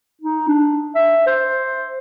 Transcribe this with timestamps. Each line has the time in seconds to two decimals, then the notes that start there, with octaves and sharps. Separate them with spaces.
0.22 D#4
0.48 D4
0.95 E5
1.27 C5